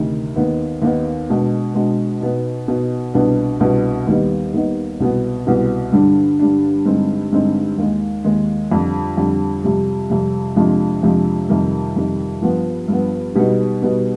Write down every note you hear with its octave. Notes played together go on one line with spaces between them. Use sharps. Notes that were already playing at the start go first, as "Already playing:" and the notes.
Already playing: D2 C3 D#3
D#2 D#3 B3 D#4
D#2 D#3 B3 D#4
B2 G#3 D4
B2 G#3 D4
B2 B3 D#4
B2 B3 D#4
C2 B2 B3 D4
C2 B2 B3 D4
D#2 D#3 G3 B3 D#4
D#2 D#3 G3 B3 D#4
C2 B2 B3
C2 B2 B3
G2 D3 G3 D4
G2 D3 G3 D4
G2 D3 G#3 C4 D#4
G2 D3 G#3 C4 D#4
D#2 D#3 G#3
D#2 D#3 G#3
F2 D3 G3 D4
F2 D3 G3 D4
F2 C3 G3
F2 C3 G3
F2 C3 F3 G#3 D4
F2 C3 F3 G#3 D4
F2 C3 D#3 G3
F2 C3 D#3 G3
G2 F3 B3
G2 F3 B3
B2 G3 B3 D#4
B2 G3 B3 D#4